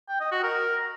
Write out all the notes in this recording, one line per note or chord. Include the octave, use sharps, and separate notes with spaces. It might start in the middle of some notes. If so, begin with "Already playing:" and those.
G5
D#5
F#4
A#4